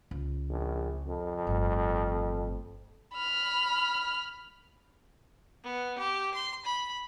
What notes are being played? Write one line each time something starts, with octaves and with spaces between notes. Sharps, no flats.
C#2
A#1
F2
G1 A2
B5 F6
B3
G4
C6
B5